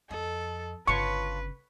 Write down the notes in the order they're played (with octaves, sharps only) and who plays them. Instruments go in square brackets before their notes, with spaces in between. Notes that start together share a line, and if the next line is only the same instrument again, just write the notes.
[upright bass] F2 [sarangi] A4 [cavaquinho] D#5
[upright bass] G1 C#3 [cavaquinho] F4 C#5 A5 [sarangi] B4 [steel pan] C#6